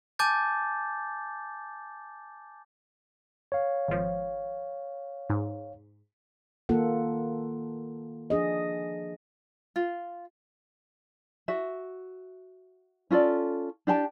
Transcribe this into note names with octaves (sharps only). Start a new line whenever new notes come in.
G#5 A5 D6 G6 A6
C#5 F5
G#1 F3
G#2
D#3 A#3 F4 A4 F#5
F3 D4 G#4 D#5
F4
F#4 E5
C#4 F4 A4 D5
D4 G4 G5 A5